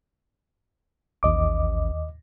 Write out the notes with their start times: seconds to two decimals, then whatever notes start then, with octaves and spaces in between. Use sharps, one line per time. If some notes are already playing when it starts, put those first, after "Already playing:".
1.23 A1 D#2 D#5 D6